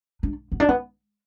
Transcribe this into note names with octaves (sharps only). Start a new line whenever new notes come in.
D4
B3
D4
B3